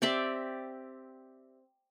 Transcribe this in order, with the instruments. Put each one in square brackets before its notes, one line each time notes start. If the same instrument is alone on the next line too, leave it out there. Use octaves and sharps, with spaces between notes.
[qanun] C4 G4 D5 E5